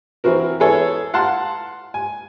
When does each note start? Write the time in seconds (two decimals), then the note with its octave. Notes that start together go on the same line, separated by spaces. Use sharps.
0.24 E3 C4 F#4 A#4
0.60 B3 E4 G#4 A4 C#5
1.14 F5 F#5 A5 C6
1.94 G#5